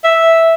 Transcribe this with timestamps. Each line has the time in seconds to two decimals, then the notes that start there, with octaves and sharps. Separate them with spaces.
0.04 E5